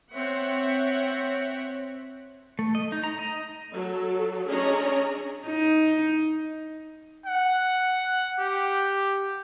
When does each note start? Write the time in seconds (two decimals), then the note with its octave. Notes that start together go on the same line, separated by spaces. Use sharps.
0.13 C4 C#5 E5 F#5
2.59 A3
2.75 D#5
2.92 D#4
3.04 A#5
3.19 D#5
3.74 F#3 A4
4.48 C#4 D4 G#4 C#5 D#5 A#5
5.46 D#4
7.26 F#5
8.40 G4